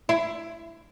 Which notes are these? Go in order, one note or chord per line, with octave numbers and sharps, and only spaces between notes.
E4